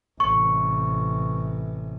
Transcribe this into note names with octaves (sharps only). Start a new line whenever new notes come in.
A1 C3 C#6